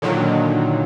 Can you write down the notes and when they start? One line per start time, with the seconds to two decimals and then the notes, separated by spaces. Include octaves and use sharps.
0.02 A#2 D3 D#3 F#3